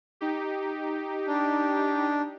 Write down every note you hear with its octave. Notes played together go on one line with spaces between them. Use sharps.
D#4 G4
D4